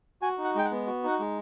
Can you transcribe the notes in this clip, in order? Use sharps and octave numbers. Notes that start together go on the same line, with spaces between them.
F#4 G#5
D#4
F#5
G#3 G5
F#5
B3
F#4
D#4 F#5
G#3